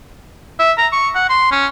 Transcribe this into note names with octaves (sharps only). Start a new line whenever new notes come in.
E5
A#5
C#6
F#5
C6
C#4